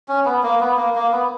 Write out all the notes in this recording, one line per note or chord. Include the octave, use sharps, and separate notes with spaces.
C#4
B3
A#3
B3
A#3
A#3
B3